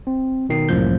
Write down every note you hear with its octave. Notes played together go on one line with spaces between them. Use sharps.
C4
B2 D#3 C7
C2 F#2 A2 F3 A#3 G6